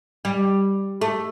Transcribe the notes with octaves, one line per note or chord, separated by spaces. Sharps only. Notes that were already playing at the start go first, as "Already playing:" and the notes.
G3
A3